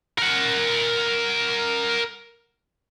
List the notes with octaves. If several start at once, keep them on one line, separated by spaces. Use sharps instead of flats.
A#4 F#5